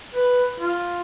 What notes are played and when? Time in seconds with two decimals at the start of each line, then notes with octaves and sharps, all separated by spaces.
0.14 B4
0.60 F4